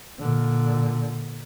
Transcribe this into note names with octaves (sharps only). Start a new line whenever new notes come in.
A#2 D3